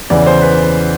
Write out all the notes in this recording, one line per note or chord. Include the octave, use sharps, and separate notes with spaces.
E2 C#3 E3 D5
C5
B4